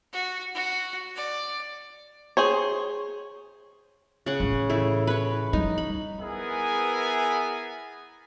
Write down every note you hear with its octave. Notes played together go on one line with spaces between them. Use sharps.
F#4
F#4
D5
G#4 C5 C#5
C#3 F#5
A2 E3
A3 E4
B4 C#5
F3 G3 D#4
B5
B3 E4 G#4 A#4 B4 G#5